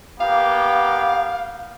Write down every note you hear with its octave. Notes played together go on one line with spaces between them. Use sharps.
A#3 B3 G4 F5